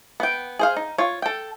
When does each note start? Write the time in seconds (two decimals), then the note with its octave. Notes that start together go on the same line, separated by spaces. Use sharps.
0.20 B3 G5
0.59 G#4 C5 F5
0.77 D#4
0.98 F4 C#5
1.22 A4 G5